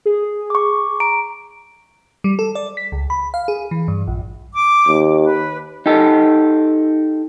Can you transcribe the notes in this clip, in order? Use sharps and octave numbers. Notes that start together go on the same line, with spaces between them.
G#4
C#6 D6
A#5 D7
G3
A4
D5
B6
C#2
B5
F5
G#4
E3
G2
A#1
D6
D#2
B4
D#4 G4 A4